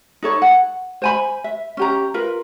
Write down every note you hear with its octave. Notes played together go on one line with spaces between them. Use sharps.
D#4 A4 C#5 B5
F#5
C5 G#5 B5
E5
C#4 G4 A#5
F4 A#4 B4